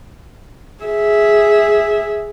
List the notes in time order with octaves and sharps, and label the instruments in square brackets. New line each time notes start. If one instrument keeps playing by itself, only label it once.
[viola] G#4 E5